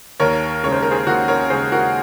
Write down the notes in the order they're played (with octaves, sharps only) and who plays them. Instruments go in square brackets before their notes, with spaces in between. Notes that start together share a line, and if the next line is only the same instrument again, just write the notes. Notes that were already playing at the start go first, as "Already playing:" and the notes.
[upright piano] D#2 A#4 C#5
C#3 G#3 C#5
C5
A#4
G#4 C5
D#2 F#4 A#4
A#4 C#5
C#3 G#3 G#4 C5
F#4 A#4